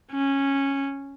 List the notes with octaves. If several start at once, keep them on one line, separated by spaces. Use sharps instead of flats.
C#4